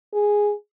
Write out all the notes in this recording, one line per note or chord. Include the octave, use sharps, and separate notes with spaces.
G#4